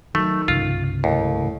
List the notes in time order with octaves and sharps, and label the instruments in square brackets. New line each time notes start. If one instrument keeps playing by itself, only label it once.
[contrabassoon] D#3 [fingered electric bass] F3 F#3 [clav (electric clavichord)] A3
[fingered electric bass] C2 G2 C#3 [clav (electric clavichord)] F4
[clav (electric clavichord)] D#2 [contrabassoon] A2